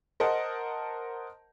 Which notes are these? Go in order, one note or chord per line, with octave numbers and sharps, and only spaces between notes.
A#4 C5 D#5 F#5 A5